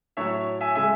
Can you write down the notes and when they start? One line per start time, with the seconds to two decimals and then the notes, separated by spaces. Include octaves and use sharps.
0.17 A2 F#3 C#5 E5
0.61 E5 G#5
0.75 C#3 G#3 E5 G#5